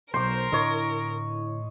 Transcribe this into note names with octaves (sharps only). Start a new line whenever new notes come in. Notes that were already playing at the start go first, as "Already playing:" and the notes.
B1 A#4 C5 C6 D6
A2 D3 C#5 D#5